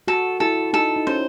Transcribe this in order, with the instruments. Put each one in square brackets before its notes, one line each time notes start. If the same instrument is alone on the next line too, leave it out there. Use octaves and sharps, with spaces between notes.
[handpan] F#4 [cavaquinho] A4
[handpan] E4 [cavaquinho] A4
[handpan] D#4 [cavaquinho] A4
[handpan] D#4
[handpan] C#4 [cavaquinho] C5